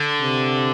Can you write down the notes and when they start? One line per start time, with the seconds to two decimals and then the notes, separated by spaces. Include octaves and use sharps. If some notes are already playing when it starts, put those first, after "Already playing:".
Already playing: D3
0.22 C3